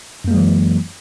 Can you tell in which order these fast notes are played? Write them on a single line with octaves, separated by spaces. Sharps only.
F#2 A#3 G#3 F#3 E3